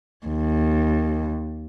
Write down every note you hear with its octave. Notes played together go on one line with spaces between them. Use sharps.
D#2